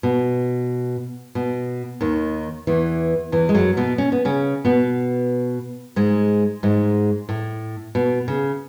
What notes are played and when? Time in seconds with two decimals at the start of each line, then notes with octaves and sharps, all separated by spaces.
0.03 B2
1.35 B2
2.01 D#2 D#3
2.67 E2 E3
3.32 E2 E3
3.49 G#3
3.54 F#2 F#3
3.77 B2 B3
3.98 C#4
4.12 B3
4.25 C#3 C#4
4.65 B2 B3
5.96 G#2 G#3
6.63 G#2 G#3
7.29 A2
7.95 B2
8.28 C#3